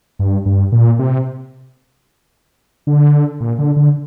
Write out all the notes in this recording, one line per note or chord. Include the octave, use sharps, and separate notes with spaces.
G2
G2
A#2
C3
D3
A#2
D3
D3